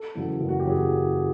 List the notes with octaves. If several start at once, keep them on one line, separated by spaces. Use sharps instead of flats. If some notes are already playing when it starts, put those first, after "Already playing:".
Already playing: A4
E2 C#3 F#3
F#1
F#4
G4
C#3 F#3 G#4